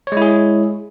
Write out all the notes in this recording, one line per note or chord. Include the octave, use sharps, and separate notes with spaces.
G#3 E4 G#4 C#5